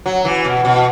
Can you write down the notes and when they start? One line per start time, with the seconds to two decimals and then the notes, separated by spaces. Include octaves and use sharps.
0.06 F#3
0.25 E3
0.44 B2
0.65 B2